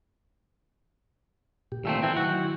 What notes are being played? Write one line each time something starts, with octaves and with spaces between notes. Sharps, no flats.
A#2 G4
A#2 D#3 A3 C4 E6
E3 C4 E4
D#3 F#3 E4 F#4